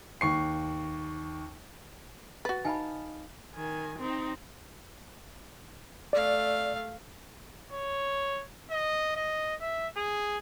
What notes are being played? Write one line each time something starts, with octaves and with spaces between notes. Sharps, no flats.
D#2 C#6 C7
F#4 B4 A6
D#4 F5 G#5 A5 B5
D#3 G#5
C4 D#4
A3 D5 F5
C#5
D#5
D#5
E5
G#4